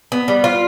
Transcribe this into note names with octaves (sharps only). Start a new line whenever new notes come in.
B3
G3
F4